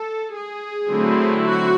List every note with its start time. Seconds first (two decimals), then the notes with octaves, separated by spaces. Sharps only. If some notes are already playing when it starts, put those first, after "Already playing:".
Already playing: A4
0.35 G#4
0.89 D3 F#3 A3 C4 E4
1.44 F#4